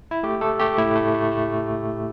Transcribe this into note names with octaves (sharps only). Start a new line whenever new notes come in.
E4
A3 G4
A3 A4
A3 G4
A2 E4
A3
A3
A3